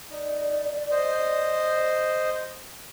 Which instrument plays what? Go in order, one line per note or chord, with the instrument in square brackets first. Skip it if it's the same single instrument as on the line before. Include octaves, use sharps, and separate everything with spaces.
[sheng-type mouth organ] D#4 [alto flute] D5
[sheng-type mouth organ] C5 D#5